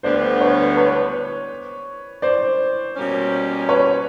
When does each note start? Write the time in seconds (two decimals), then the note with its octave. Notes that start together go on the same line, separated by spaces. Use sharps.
0.03 D2 D3 G3 B3 C5 D5
0.40 B4 C#5
0.77 B4 C#5
2.22 C5 D5
2.95 B2 G3 A#3 C#4
3.69 B4 C#5